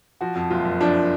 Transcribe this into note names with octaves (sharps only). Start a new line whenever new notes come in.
F3 F#4
F2
F#1 F4
F#1
F3 D4